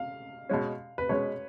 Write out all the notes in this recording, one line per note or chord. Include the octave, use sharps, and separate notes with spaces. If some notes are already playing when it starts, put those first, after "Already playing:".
Already playing: F5
B2 G#3 C#4
B4
B2 G#3 C#4 C#5